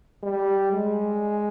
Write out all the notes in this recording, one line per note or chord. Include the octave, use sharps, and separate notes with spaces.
G3
G#3